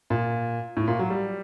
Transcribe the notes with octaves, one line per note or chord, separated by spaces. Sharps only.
A#2
A2
A#2
F#3
G3